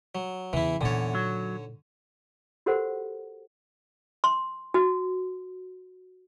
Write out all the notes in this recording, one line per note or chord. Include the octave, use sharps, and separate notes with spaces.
F#3
E2 C#3 E3 E4
E2 A#2 D3 D#4 C#5
F#3
F#4 G4 A4 A#4 C5 F#5
C6
F#4